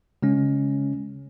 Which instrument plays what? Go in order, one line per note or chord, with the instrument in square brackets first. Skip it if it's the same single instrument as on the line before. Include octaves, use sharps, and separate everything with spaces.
[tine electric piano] C#3 G#3 C#4